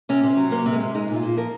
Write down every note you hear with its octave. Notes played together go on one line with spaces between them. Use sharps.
C3 C#4
C3
C4
F#3
C3 A#3
C3
G#3
C3
G#3 D#4
A#2
F4
A#2
F3 A#4